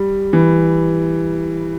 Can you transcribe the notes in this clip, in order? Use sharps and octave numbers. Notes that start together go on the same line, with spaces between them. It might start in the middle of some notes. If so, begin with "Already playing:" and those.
Already playing: G3
E3